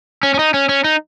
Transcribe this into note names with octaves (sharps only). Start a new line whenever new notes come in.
C#4
C#4
D#4
C#4
C#4
D#4